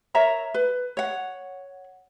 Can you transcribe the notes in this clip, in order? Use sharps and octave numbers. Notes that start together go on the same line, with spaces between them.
A#4 C#5 E5 A#5
B4
C#5 F#5